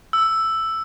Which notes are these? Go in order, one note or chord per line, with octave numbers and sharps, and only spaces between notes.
E6